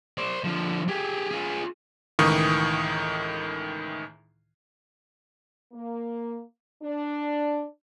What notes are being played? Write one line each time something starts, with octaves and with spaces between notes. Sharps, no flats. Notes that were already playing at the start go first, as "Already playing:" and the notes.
C5 D5
D3 F3
G4 G#4
F4 G#4
C#2 A2 D#3 E3 C#6 D#6
A#3
D4